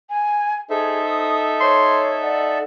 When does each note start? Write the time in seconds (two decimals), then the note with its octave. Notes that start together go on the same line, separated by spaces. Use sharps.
0.10 G#5
0.70 D#4 G#4 A4 C5 E5
1.05 D#6
1.60 C#5 C6
2.22 D5 F#5